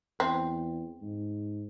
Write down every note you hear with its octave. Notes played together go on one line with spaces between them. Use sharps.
E2 C4
G#2